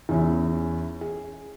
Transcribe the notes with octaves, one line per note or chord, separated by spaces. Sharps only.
E2 C#4 E4
G#4